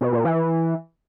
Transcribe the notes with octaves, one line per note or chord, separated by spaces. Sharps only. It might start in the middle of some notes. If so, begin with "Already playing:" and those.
B2
A#2
E3